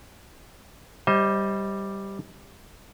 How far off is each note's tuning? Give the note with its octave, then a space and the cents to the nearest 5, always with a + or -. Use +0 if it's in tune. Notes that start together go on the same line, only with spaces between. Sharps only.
G3 +0 C5 +30 D#5 +30